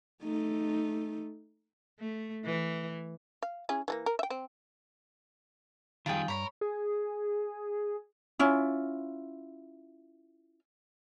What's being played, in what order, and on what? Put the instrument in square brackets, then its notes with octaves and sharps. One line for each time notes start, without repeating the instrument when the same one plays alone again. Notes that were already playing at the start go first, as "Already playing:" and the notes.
[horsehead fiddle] A3 D#4
[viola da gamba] A3
E3
[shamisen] F5
C#4 E4 G#4
E3 A3 A#3
A#4
E5 G5
C4
[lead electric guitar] F2 [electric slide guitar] D#3 F3 G3 [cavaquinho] F4 G#4 G5
[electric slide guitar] G2 [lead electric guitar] A#4 [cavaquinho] C#5 B5
[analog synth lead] G#4
[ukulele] C#4 E4 F4